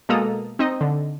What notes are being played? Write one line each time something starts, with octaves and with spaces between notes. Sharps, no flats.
B2 G#3 A#3 A4 A#5 D#6
C4 D#4 D#5
D3